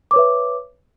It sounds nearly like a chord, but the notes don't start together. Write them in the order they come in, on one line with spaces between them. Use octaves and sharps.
D6 C#5 B4 E5